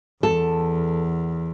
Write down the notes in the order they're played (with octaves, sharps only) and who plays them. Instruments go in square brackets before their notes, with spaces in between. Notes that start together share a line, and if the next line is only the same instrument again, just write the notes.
[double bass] E2 [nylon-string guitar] A4